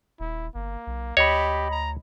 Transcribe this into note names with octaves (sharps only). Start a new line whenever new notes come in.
D#1 E4
G1 A#3
B1
D2 G4 C#5 D#5 B5
A#5